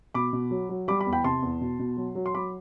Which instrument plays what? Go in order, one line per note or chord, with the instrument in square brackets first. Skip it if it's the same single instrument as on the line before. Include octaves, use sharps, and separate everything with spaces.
[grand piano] B2 B5 D6
B2
F#3
F#3
G3 B5 D6
B5 D6
E2
G5 B5
C3 A5 C6
E2
B2
B2
F#3
F#3
C6
F#3 B5 D6